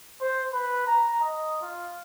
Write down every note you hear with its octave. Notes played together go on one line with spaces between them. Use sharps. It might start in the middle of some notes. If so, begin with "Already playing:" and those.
C5
B4
A#5
D#5
F4